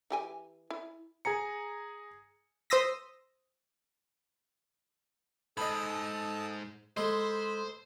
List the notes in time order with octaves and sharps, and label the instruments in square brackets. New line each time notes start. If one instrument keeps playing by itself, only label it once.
[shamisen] E3 G4 G#5
E4
[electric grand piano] G#4 G#5 A#5 C#7
[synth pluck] C5 C6 D#6 E6 A#6 B6
[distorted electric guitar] G#2 [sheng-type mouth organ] A4 A5 D#6 [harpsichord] D#5 B5
[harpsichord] G#3 A4 [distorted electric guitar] C5 [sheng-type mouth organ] B5